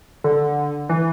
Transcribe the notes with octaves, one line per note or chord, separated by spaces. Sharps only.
D3
E3